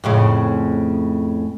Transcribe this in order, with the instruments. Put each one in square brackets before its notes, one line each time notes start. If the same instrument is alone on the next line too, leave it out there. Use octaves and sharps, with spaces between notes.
[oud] F2 A2 C#3